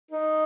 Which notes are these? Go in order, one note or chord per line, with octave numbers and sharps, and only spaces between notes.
D#4